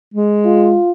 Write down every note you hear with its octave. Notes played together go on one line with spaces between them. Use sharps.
G#3
F4